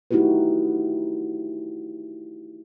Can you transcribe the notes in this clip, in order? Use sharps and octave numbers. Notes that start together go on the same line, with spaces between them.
A3 D#4 E4 F#4 G4 B4